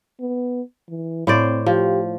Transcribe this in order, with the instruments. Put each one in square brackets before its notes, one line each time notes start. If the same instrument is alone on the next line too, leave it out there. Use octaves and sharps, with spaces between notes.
[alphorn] B3
E3
[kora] A2 C5 D5 [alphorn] C4
[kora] F3 [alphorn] G4